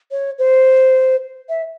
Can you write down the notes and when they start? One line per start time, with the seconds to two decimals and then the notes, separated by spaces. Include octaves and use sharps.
0.11 C#5
0.38 C5
1.49 E5